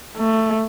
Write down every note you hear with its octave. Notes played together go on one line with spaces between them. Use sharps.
A3